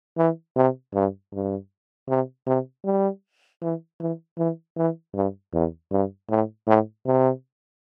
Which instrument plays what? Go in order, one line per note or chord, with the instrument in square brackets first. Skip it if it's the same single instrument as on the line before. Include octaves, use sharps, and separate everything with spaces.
[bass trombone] E3
C3
G2
G2
C3
C3
G3
E3
E3
E3
E3
G2
E2
G2
A2
A2
C3